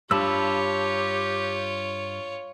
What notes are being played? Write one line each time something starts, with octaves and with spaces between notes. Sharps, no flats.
G2 F4 G4 C#5 A5 B5 E6